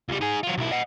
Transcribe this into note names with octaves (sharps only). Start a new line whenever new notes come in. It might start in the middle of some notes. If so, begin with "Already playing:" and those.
C#2 G3
D#4 G#4
F#3 F4
B1 E4
D#5 F#5